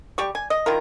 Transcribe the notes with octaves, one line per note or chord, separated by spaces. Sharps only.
G3 G4 C#6
G#5
D#5
D#3 E4 F4 A#4